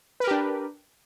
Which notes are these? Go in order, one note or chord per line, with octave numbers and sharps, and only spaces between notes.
D4 G4 A#4 B4